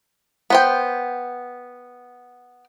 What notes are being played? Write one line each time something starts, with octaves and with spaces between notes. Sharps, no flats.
B3 C5 G5